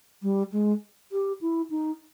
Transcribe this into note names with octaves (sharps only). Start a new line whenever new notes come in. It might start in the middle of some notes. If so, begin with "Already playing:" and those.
G3
G#3
G4
E4
D#4